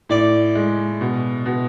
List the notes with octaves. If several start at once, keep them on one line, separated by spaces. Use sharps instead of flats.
A2 D5
G#3
B2
B2